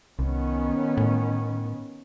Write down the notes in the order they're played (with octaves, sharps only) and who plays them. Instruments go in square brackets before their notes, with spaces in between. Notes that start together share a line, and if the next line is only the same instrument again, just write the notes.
[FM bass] C2 [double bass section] D#3 B3 C#4
[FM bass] A2